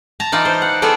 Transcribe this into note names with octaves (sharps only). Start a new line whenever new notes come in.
A5 A#5
E3 D#4 F4 D5
C5
F#5
B3 F4 G#4 A4 D5